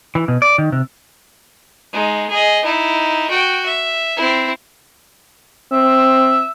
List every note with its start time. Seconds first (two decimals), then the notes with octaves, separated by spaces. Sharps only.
0.15 E3
0.28 B2
0.42 D5
0.58 D#3
0.72 C3
1.93 G#3 D#4
2.30 G#4 D#5
2.64 D#4 E4
3.30 F#4 G5
3.66 E5
4.17 C4 E4
5.72 C4 E5